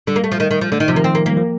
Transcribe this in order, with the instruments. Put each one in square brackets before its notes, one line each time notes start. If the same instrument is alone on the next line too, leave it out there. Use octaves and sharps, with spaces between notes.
[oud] D3 [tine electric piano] G3
[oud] A#3
A3
F3
D#3
D#3
F3
[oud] D3 [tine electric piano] A3
[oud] D#3 [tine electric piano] D#4
[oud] C3 [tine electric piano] F3
[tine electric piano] D#3 [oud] A#3
[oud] C4
A#3
[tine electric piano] G3 [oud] A#3
[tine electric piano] F3